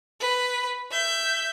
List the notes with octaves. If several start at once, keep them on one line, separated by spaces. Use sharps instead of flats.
B4
E5 G6